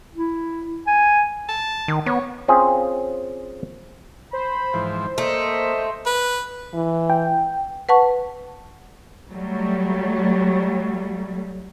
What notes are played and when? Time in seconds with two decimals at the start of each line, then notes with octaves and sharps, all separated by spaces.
0.15 E4
0.87 G#5
1.49 A5
1.88 D#3
2.06 B3 C#5
2.48 C4 C#4 F4 G#4
4.33 C5 B5
4.73 G#2 E3 F3
5.18 A3 A#3 D#5
6.06 B4
6.74 E3
7.10 G5
7.89 B4 F#5 A5 C#6
9.32 F#3 G3 A3